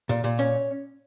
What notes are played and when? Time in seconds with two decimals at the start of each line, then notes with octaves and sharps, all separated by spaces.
0.09 A#2
0.24 A#2
0.39 C#4